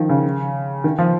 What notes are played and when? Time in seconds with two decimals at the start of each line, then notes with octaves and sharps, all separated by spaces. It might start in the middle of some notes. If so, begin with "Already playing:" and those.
Already playing: D#3 F3
0.09 C#3
0.84 D#3
0.98 F3